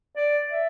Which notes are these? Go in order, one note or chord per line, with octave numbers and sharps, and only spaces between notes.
D5
E5